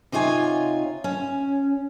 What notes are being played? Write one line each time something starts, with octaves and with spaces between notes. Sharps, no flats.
C3 D#4 F4 C#5 G#5
C#4